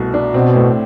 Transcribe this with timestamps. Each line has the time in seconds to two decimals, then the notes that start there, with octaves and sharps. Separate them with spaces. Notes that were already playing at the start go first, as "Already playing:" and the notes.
Already playing: C2 B2 A3
0.14 D4
0.34 B2 C4
0.55 A2